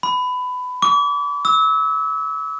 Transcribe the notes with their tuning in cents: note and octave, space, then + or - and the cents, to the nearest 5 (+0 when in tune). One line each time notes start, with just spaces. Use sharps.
B5 +20
D6 -40
E6 -30